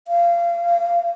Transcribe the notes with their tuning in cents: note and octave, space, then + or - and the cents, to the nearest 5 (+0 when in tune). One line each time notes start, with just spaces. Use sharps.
F5 -25